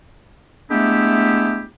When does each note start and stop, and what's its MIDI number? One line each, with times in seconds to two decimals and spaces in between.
0.70 1.64 56
0.70 1.64 57
0.70 1.64 59
0.70 1.64 62
0.70 1.64 64
0.70 1.64 67